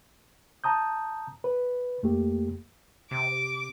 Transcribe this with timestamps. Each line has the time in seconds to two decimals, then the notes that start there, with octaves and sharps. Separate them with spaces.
0.64 A5 A#5 D#6 G6
1.44 B4
2.03 F2 A3 A#3 G4
3.11 C3 D6